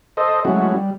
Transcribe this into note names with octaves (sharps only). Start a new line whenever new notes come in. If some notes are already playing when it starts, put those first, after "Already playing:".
A4 C5 D#5
F#3 G#3 A3 C#4 E4 F#4
G3